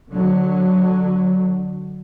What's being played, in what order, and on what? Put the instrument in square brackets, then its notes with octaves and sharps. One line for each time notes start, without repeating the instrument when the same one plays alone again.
[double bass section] D3 F#3